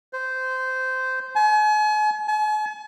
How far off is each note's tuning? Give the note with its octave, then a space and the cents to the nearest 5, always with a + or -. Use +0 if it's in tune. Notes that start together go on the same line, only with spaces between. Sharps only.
C5 -15
G#5 +40
G#5 +45